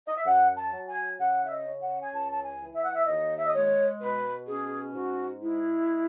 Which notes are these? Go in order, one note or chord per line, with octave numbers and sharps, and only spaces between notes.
D#5
E5
F#2 F#5
A5
F#3
G#5
C#3 F#5
E5
D#5
C#4
F#5
G#5
C#2 A5
A5
G#5
E3
E5
F#5
E5
D#2 D#5
E5
D#5
G#3 C#5
B2 B4
C#4 G#4
G#2 F#4
G#3 E4